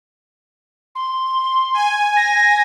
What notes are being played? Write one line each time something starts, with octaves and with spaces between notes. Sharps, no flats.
C6
G#5
A#6